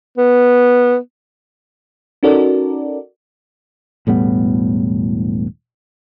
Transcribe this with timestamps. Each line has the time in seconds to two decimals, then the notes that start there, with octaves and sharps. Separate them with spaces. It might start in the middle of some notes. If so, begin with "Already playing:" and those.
0.18 B3
2.23 C#4 D#4 F#4 A4 A#4 D5
4.07 E1 A2 G3 B3